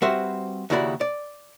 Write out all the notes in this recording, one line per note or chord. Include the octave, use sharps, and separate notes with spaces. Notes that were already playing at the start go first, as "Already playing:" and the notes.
G3 C4 F#4 B4 C5 E5
D#2 C#3 E4 F#4 D5 B5
D5